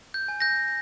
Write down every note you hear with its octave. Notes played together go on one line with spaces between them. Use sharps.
G6
G#5
G6 A#6